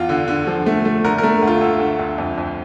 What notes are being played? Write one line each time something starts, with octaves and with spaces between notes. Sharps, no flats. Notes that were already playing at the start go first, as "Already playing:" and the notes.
Already playing: E2 F4
D3
D3
F3
A3
A3
D3 A#4
A#4
A3
D2
F4
D2 A4
D2
D2
F2
F2